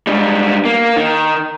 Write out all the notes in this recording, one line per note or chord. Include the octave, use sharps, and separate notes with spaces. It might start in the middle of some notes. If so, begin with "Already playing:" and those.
G#2 G3
A#3
D#3